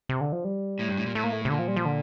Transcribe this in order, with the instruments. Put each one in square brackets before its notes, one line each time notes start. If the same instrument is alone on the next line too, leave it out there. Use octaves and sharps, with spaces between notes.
[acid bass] C3
D3
F3
G3
[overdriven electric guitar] A2
G2
A2
A#2
[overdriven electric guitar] A2 [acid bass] A3
[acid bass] A#3
A3
C3
[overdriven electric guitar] A#2 [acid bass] D3
[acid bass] F3
G3
F3
D3